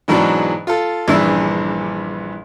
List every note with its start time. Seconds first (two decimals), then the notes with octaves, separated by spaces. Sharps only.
0.08 G#2 B2 E3 F#3 G#3 D4
0.67 F4 A4
1.08 A#1 G2 C#3 E3 D4 E5